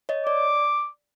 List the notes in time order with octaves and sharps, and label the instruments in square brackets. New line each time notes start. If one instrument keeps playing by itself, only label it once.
[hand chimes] C#5 D#5
[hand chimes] D5 [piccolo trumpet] D6